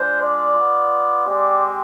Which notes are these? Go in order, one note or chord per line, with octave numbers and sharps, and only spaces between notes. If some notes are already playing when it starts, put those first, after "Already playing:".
Already playing: G#3 D4 F4 C5
D5
B3 F4
G#3 C4 G4 D5